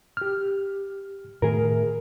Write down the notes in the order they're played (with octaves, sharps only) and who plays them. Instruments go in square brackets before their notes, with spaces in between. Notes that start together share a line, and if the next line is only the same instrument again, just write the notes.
[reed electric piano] G4 F6
[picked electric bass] A2 D#3 A3 [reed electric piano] G#4 A#4